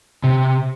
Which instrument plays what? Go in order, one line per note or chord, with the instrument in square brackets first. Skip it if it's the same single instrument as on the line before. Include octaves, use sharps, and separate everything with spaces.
[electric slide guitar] C3